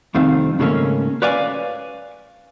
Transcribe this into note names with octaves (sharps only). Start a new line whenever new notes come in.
C2 F2 D#3 A3 C4 F5
G#2 C#3 G3 A3 A#3 C#4
B4 C#5 D5 F5 G#5